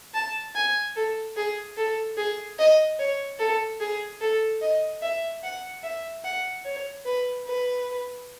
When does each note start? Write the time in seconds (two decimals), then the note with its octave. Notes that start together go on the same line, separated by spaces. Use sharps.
0.14 A5
0.55 G#5
0.96 A4
1.36 G#4
1.77 A4
2.17 G#4
2.59 D#5
2.99 C#5
3.39 A4
3.80 G#4
4.21 A4
4.62 D#5
5.02 E5
5.43 F#5
5.83 E5
6.24 F#5
6.65 C#5
7.05 B4
7.46 B4